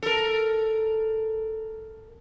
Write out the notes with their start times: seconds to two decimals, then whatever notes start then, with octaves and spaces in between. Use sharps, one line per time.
0.02 A4 A#4